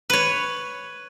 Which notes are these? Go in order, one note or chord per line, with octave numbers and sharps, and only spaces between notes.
B4 C#5